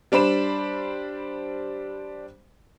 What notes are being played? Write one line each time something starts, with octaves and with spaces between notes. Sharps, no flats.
G3 D4 C5 B5 E7